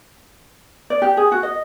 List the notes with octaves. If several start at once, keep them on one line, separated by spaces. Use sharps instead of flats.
D5
G4
G#4
F#4
D#5